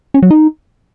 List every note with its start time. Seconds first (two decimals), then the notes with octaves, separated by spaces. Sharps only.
0.14 C#4
0.22 F#3
0.31 D#4